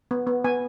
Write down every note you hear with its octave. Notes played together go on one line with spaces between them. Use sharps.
B3
B3
B3 G#5